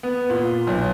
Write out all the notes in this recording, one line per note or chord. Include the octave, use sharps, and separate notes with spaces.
B3
A#2
B1